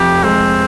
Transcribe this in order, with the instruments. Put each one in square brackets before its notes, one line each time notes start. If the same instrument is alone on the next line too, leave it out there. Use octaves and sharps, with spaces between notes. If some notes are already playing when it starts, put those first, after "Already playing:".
Already playing: [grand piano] F1 F2 [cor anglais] G4
[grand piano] G#3 [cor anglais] C4